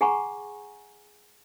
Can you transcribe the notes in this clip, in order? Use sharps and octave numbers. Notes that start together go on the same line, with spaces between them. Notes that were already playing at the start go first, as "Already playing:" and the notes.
G#4 F#5 G#5 A#5 C#6